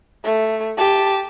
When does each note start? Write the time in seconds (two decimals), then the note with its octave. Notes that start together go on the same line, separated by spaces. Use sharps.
0.24 A3
0.78 G4 A5